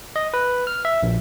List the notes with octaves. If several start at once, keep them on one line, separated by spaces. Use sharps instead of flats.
D#5
B4
F6
E5
A#1